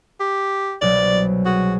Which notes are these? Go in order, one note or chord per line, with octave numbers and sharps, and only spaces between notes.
G4
C2 B2 F#3 D5
F#4 G#4